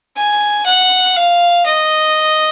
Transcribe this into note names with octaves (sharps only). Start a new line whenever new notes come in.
G#5
F#5
F5
D#5